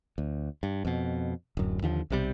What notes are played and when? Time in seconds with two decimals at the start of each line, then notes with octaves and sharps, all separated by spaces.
0.18 D2
0.63 G2
0.85 F2 B2
1.57 D1 F#2
1.82 D#2 D3 F3
2.10 B1 C3 G3